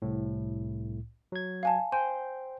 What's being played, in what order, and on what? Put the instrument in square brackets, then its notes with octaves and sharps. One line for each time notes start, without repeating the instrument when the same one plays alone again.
[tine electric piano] C2 A2
F#3 G#6
[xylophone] F5 G#5 A5
[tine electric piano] C5 G5 [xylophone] G#5